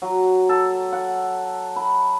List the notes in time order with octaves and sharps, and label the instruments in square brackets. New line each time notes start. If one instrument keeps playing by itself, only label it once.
[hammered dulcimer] F#3
A4
F#5
B5